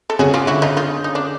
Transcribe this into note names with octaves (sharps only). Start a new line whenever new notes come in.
A4
C#3 F#4 G#4
F4 G4
D3 E4 F#4
D#4 F4
D#4 F4
D#4
D4